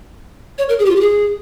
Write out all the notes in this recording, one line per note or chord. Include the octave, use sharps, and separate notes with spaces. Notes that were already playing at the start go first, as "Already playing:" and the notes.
C#5
A#4
G#4
G4
F4
G4
G#4